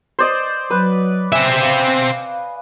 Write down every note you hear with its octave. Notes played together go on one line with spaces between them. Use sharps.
C5 D5 D#5
F#3 B4
C4 E5 G#5
F5